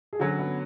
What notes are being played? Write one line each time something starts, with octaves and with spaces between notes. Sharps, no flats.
G#4
D3 F#3 C#4 F#4
B3